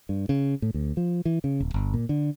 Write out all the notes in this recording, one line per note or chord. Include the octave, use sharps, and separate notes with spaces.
G2
C#3
A2
D2
F3
E3
C#3
D#1
G1
A#2
D3